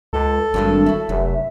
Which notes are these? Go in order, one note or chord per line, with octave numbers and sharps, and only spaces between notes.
C#2 A4
G#1 G2 G#3 D4
E4 F#4 E5
F1 F#2